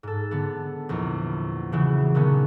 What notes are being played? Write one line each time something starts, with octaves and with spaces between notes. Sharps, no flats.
G#2 A4
D3 B3
A#1 E2
C#3 E3 F#3
A#2 D3 D#3 B3 C#4